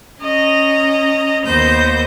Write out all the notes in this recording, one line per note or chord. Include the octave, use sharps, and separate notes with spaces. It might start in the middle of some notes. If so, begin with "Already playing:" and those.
C#4 D#5 A#5
D#2 B3 C5 G6 A#6